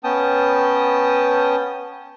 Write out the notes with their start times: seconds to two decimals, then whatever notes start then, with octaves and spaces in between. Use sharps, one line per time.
0.04 B3 C#4 G5 A5 D#6